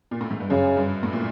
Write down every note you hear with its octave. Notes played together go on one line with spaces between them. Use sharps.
A#2
A2
G#2
G2
F#2 C#3
G2
A2
A#2